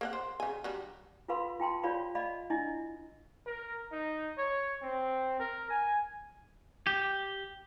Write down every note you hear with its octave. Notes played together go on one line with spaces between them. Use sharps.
A#3 C5 F#5
C5
C#3 G#5
F#3 G3 D4
F4 A4 B4 F5 B5 C6
F4 G5 A5 C6
F4 C#5 D5 F5 B5
D5 D#5 F5 B5
D4 E4 D#5
A#4
D#4
C#5
C4
A#4
G#5
G4